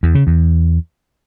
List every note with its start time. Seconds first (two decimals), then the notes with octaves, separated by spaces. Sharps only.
0.03 E2
0.15 C#3
0.27 E2